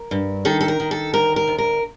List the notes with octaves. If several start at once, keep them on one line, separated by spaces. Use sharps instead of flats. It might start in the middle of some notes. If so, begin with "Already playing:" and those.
Already playing: A#4
G2
D#3 A4
A4
A#4
D#3
A4
D2 A#4
A#4
D2
A#4